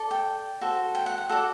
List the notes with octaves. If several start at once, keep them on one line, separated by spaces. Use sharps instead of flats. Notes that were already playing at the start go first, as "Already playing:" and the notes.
Already playing: A4 D5
G5
F#4 A4 C5
G5
F#5
F#5
F#4 A4 D5 F#5